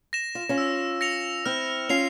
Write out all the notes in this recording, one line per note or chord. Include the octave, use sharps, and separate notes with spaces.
A#6 E7
F4
C#4 F4
E6
A#6 C#7 F7
C4 E4 F6
C#4 F4 C7 F7